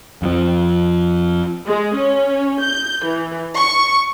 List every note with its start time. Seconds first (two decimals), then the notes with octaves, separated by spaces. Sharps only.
0.22 F2 F3
1.65 G#3
1.95 C#4
2.61 G6
3.05 E3
3.55 C#6